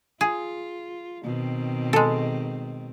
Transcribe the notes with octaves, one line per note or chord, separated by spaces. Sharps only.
F4 G#4
B2 D#3 C4
G#3 A4